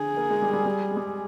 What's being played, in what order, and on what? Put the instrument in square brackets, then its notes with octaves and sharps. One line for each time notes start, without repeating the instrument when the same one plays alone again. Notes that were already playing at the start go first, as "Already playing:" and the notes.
Already playing: [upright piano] D3 [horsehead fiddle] G#4
[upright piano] A#3
G#3
G3
G3
G3
G#3
G3